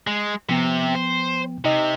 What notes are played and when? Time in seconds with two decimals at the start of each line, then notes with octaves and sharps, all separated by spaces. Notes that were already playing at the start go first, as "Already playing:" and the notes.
0.07 G#3
0.49 C3 F3 B3 G5
0.95 C5
1.65 C3 D#4 D#5